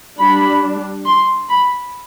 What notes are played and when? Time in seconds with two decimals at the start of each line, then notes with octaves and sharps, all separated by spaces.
0.19 G3 D4 B5
1.05 C6
1.49 B5